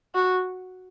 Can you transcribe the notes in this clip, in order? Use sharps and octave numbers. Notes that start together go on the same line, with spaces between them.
F#4